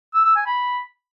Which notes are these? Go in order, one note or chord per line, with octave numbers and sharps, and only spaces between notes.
E6
E6
G#5
B5